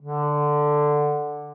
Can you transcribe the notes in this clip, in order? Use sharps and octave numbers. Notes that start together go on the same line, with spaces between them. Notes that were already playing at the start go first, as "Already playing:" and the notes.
D3